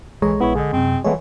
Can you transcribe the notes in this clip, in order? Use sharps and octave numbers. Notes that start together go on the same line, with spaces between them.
B1 E3 G#3 A4 C#5 A#5
A#1 B3 E4 C#5
D3 G#4 D#5
F#2 C3 C4
E3 G#3 A3 B3 C#5